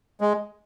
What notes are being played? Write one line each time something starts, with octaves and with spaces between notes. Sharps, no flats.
G#3